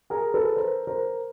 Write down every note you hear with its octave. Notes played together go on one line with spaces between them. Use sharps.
G#4 A#4
A4 B4
A#4 C5
A#4 C5